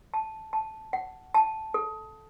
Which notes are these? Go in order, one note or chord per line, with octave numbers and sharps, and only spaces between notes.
A5
A5
F#5
A5
A4